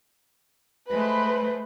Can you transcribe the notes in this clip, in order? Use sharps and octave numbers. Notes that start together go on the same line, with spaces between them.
G#3 A3 B4 C5